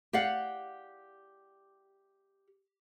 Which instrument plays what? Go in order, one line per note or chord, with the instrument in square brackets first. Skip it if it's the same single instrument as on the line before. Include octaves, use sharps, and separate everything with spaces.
[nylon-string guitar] G4 D5 F5 F#5